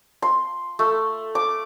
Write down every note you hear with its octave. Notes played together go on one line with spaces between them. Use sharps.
C6
A3
D6